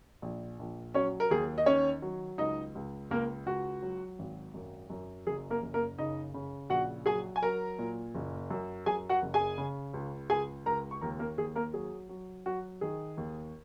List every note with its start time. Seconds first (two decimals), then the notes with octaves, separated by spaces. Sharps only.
0.22 A#1
0.59 A#1
0.94 F#3 C#4 C#5
1.20 A#4
1.30 D#2 G#4
1.58 D#5
1.66 D#3 C#4 C#5
2.02 F#3
2.38 C#2 D#4 D#5
2.75 C#2
3.11 C#2 A#3 A#4
3.46 C#2 F#4
3.82 F#3
4.19 G#1
4.54 F#2
4.90 F#2
5.27 F#1 G#4
5.50 A#3 A#4
5.62 F#1
5.74 A#3 A#4
5.98 C#3 D#4 D#5
6.34 C#3
6.70 A#1 F#4 F#5
7.06 F#3 G#4 G#5
7.36 G#5
7.42 F#3 A#4 A#5
7.79 A#2
8.15 F#1
8.51 F#2
8.86 F#2 G#4 G#5
9.09 F#4 F#5
9.22 F#1
9.34 G#4 G#5
9.58 C#3
9.94 C#2
10.30 C#2 G#4 G#5
10.66 C#2 A#4 A#5
10.91 C#6
11.01 D#2 A#4 A#5
11.19 A#3 A#4
11.38 D#2 G#4
11.55 A#3 A#4
11.74 F#3 G#4
12.09 F#3
12.46 F#3 F#4
12.81 D#3 G#4
13.17 D#2